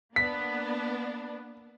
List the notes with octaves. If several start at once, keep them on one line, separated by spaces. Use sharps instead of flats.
A#3 B3 D4 B6